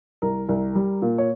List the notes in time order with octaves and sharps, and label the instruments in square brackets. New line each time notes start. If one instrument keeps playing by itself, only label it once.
[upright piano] C2 A#4
C2
G3
A#2
C#5